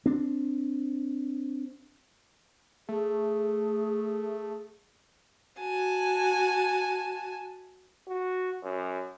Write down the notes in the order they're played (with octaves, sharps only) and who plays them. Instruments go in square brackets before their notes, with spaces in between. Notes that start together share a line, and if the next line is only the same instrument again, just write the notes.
[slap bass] C4 D4
[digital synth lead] A3 [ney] G#4
[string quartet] F#4 G#5 A5
[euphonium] F#4
F#2